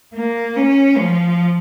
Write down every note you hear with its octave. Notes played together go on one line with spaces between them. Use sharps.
A#3
C#4
F3